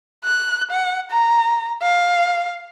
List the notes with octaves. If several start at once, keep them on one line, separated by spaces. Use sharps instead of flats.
F#6
F#5
A#5
F5